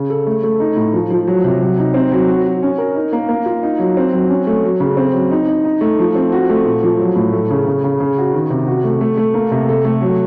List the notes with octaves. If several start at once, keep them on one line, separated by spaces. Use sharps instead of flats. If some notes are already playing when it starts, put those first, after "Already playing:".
Already playing: C#3
A4
A3
A3
D#4
A2
F3
F3
F#3
C3
F#3
D#4
C4
F#3
F#4
F#4
C#4
A#4
D#4
A#3
A#3
F4
D#4
F#3
C4
F#3
C#4
A3
F#3
C#3
C4
F#3
D#4
D#4
D#4
A3
F3
C4
F#4
A3
A#2
F3
F#3
A2
A3
C#3
C#3
C#3
C#3
F#4
D#3
C3
F#4
A3
A3
A3
A#3
C3
A4
A3
F#3